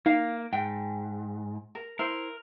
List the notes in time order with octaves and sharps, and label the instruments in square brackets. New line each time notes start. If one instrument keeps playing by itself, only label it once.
[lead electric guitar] A#3 [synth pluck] D#4 [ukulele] F5
[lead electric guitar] G#2 [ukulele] G5
[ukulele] A#4
[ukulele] E4 C5 [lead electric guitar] A#4